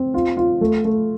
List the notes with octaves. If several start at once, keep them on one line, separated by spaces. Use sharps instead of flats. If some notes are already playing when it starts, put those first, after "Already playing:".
Already playing: C4
F4
F4
A3
A3